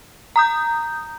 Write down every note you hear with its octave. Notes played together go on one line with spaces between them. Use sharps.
A#5 D#6 G6